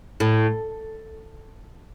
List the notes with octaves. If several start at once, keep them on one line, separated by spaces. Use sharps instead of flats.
A2